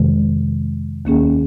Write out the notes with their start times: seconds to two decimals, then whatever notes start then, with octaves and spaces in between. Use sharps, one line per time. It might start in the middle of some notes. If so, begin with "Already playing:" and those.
Already playing: F2 C3 D#3 G#3
1.05 D#2 D#3 A#3 C#4 G#4